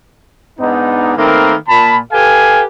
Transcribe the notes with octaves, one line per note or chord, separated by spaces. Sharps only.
G#2 B3 D4 D#4
D#3 A3 A#3 C4 A#4 B4
A#2 A5 B5
G4 A4 B4 F5 G#5